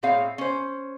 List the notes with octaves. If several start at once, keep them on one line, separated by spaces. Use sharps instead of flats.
A2 C4 G#4 C#5 F5
C#4 C5